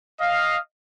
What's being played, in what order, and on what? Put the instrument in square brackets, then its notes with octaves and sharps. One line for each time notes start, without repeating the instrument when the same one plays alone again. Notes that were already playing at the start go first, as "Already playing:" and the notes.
[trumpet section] D#5 F5